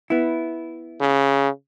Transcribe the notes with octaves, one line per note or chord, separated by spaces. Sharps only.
B3 E4
C#3